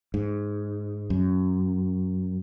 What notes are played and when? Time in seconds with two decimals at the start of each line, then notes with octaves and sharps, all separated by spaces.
0.14 G#2
1.10 F#2